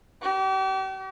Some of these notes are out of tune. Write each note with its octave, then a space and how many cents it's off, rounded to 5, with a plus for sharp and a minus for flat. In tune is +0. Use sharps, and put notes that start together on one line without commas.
G4 -40